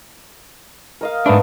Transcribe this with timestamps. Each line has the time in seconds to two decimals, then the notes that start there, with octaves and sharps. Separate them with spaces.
1.01 A#4 D#5 F5
1.26 G#2 A3 B3 D4